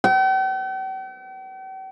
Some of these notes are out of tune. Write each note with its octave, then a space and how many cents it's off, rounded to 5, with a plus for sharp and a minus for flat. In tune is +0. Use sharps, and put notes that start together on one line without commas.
G5 -45